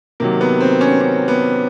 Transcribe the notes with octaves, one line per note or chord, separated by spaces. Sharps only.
C3 D#3 F#3 A#3
B3
C4
C#4
C#4
B3